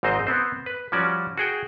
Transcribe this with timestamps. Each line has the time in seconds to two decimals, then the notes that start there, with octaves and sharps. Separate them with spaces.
0.03 G#1 G#2 C4 D#4 C5 D#5
0.27 B3 C4 C5
0.66 B4
0.92 F3 G3 C#4 F#4 D5
1.38 F#4 G#4 G5